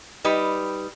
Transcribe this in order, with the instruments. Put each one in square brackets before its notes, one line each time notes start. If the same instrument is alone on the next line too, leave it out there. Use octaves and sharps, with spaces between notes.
[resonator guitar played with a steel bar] G3 D#4 B4